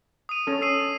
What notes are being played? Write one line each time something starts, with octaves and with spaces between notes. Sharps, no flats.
D#6 D#7
C#4 A4
E6 C7 D#7